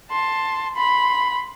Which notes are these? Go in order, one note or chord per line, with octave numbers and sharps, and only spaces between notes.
A5 C6
B5 C6